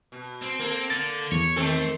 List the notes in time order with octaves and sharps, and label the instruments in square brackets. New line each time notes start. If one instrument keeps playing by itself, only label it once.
[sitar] B2
[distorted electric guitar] C4
[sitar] A#3 A4
[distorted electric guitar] D3 [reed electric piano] A6
[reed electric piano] E2 [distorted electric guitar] C#5
[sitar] D#3 C4 A4 [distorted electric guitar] A3